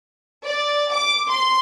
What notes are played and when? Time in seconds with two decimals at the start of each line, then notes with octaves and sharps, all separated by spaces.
0.44 D5
0.91 D6
1.30 C6